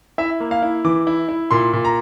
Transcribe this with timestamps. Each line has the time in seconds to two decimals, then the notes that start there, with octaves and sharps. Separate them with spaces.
0.18 E4 E5
0.40 A#3
0.51 F5
0.62 E4
0.84 E3 D6
1.07 E4
1.29 E4
1.51 A#2 C6
1.73 A#2
1.85 A#5